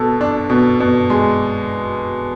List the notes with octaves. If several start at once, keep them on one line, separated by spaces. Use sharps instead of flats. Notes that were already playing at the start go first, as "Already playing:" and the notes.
Already playing: B2 A4
D4
B2
B2
G#3